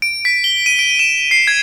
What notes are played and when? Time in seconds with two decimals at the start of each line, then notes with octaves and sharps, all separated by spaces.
0.02 D7
0.25 B6
0.44 G7
0.66 D#7
0.79 D7
0.99 E7
1.31 C7
1.47 G#6